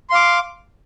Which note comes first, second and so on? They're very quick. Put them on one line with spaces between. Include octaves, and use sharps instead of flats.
C6 F5 D6